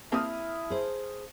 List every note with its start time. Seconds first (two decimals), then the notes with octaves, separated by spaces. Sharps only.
0.12 A#3 C4 E4 G4 A5 D#6 F6
0.70 G#4 C5